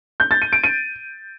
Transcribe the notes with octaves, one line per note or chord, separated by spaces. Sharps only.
G6
A6
D#7
D7
D#7